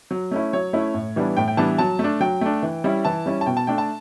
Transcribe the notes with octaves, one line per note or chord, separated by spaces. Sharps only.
F#3
A3 C#4 E4
F#3 C#5
A3 C#4 E4
A2
E3 G3 B3 D4
A2 G5
G5
E3 G3 B3 D4 A5
F#3 A5
A3
D4
F#3 G5
A3 D4
E3
G3 C#4 E4
E3 A5
G3 C#4 E4
A5
B2 G5
A5
A3 D4 G5
A5